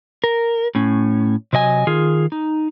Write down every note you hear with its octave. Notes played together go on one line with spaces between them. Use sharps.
A#4
A2 C#4
C3 F#3 D#5 G#5
D#3 F4 G#4
D#4